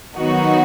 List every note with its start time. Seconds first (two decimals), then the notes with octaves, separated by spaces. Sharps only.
0.16 D#3 F#3 B3 D#4 F#4